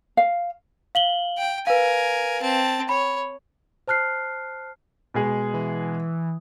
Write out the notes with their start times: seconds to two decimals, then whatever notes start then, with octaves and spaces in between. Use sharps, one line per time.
0.17 F5
0.95 F5 F#7 G7
1.38 G5
1.67 A#4 B4 F5 G#5
2.42 C4 A5
2.89 C#5 B5
3.88 C5 A5 F6 F#6 C7
5.14 B2 G#3 G#4
5.54 E3